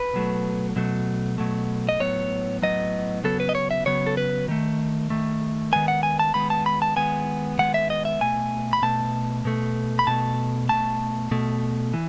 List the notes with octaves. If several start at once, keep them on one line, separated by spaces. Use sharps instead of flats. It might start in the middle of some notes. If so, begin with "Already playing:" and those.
Already playing: B4
B2 F#3 A3
B2 F#3 A3
B2 F#3 A3
D#5
A2 F#3 B3 C#5
A2 F#3 B3 D#5
C#3 F#3 B3 A4
B4
D#5
C#5
E5
C#3 F#3 B3 C#5
A4
B4
D#3 A3
D#3 A3
D#3 G#3 B3 G#5
F#5
G#5
A5
D#3 G#3 B3 B5
A5
B5
A5
D#3 G#3 B3 G#5
D#3 G#3 B3 F#5
E5
D#5
E5
B2 A3 G#5
B5
B2 A3 A5
B2 A3
B5
B2 A3 A5
B2 A3 A5
B2 A3
E3